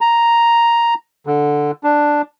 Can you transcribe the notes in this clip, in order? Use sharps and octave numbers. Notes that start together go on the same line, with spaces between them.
A#5
D3
D4